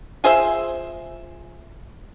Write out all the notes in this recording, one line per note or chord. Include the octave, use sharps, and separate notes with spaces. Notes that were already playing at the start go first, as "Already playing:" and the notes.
F4 G#4 C5 E5